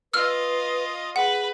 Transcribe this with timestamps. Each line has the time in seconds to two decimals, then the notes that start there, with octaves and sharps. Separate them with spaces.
0.14 F4 B4 D#5 E6 F6
1.16 G#4 B4 F#5